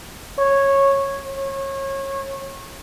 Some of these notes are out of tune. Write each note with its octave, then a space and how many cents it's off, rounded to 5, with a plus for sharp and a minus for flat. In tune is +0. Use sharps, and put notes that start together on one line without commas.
C#5 -10
C#5 -30